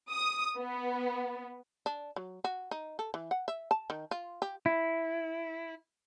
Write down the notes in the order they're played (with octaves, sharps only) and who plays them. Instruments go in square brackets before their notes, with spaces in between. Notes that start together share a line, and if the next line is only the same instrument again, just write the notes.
[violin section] D#6
B3
[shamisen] D4
F#3
F#4
D#4
A4
E3
F#5
E5
A5
D#3
F4
G4
[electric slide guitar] E4